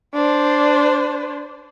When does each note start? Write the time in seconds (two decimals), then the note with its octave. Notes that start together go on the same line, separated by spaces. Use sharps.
0.14 D4 C5